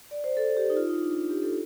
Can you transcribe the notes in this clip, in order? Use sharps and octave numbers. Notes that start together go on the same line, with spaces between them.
D5
C5
A4
G4
D#4
F4
D#4
D4
D#4
G4
A4